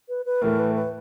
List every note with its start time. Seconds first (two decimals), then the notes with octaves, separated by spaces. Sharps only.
0.09 B4
0.25 B4
0.41 A2 E3 A3 A#4
0.59 B4
0.75 B4